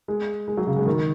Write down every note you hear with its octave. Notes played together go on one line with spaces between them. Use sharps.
G#3
G#3
F#3
C#3
G#3
D#3